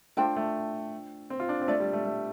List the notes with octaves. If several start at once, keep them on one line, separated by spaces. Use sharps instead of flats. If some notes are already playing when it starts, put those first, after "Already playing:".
A3 D4 F4 C5 G5
A3
C4
F4
D4
C4
A3 D4 F4 D5
G3
A3
A3